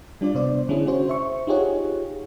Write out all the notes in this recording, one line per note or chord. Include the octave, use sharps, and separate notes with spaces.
G3 D4 F4 D5
C3 B3 C5 D5
D3 C#4 D4 E4 G#4
C#4 F#4 C5 C#5
C5 E5 C#6
D#4 F4 G4 G#4 C#5 F#5